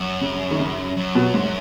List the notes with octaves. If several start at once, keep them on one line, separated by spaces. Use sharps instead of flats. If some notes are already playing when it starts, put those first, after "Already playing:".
Already playing: F#2
C#3
D#3
C#3
F#2
B2
G#2